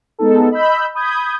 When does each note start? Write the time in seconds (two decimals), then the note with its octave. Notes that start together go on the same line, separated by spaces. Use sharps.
0.19 G#3 B3 D#4 A4
0.51 D#5 B5 E6 G6
0.95 B5 D#6 G6 G#6